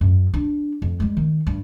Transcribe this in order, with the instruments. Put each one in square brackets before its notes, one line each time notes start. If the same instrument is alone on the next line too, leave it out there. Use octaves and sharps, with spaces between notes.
[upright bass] F#2
D4
F2
G3 G#3
D#3
G2